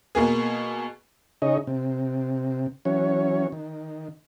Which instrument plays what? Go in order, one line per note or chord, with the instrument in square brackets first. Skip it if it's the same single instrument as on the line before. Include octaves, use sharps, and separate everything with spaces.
[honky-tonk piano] B2 A#3 G#4
[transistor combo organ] C#3 D#4 G#4 C#5 D#5
C3
E3 F#3 C#4 C#5
D#3